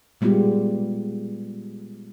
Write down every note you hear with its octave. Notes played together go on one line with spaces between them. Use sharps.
A#2 G3 G#3 B3 F4 G4